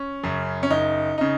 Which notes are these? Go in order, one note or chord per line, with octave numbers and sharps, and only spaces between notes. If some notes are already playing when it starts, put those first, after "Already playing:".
Already playing: C#4
F#2 C#3
C#4
F#1 D#4
C#3 D#4